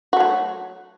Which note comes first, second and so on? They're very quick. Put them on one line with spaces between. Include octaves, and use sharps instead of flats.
F#4 A3 F#3